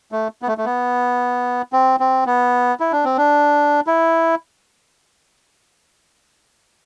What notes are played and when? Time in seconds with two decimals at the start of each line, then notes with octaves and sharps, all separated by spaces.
0.12 A3
0.42 B3
0.48 A3
0.58 A3
0.65 B3
1.73 C4
2.00 C4
2.26 B3
2.80 E4
2.92 D4
3.05 C4
3.18 D4
3.87 E4